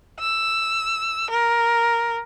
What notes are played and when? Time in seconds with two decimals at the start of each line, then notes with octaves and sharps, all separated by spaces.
0.20 E6
1.31 A#4